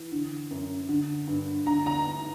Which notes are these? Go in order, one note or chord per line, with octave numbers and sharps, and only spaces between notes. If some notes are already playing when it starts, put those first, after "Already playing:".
Already playing: E3
D3
F#2
D3
G2
D3 A#5
A#5